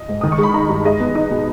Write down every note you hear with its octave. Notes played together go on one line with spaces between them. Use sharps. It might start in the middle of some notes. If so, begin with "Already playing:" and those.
Already playing: D#5
G#2
D#3 D#6
C#6
G#3 B5
D#4 A#5
G2
G#3 D#5
B3
D#4
B2